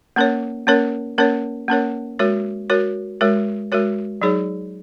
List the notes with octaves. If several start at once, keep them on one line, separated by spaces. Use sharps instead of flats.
A#3 C#4 A#4 C#5
A#3 C#4 A#4 C#5
A#3 C#4 A#4 C#5
A#3 C#4 A#4 C#5
G#3 F#4 A#4 C#5
G#3 F#4 A#4 C#5
G#3 F#4 A#4 C#5
G#3 F#4 A#4 C#5
F#3 D#4 G#4 C#5